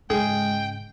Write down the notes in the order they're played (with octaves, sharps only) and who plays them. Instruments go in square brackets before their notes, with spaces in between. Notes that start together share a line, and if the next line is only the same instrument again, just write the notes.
[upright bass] G#2 C#3 [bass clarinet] G#3 [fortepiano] G#4 [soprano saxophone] G5